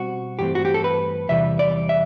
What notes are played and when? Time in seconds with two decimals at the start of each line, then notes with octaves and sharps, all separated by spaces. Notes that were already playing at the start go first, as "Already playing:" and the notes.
Already playing: B2 G3 C4 F#4
0.39 G2 E3 A3 C4 G4
0.55 F#4
0.65 G4
0.74 A4
0.84 B4
1.29 E2 C3 E3 G3 E5
1.59 D5
1.89 E5